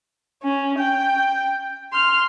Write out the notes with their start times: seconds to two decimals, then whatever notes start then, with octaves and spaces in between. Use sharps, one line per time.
0.43 C#4
0.79 G5
1.92 C6 F6